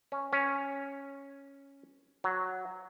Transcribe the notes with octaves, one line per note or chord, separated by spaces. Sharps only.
C#4
C#4
F#3